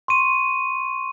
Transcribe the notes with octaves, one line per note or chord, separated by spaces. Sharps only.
C6 C#6 D#7